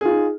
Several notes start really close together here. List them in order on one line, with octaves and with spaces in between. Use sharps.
G#4 F4 D#4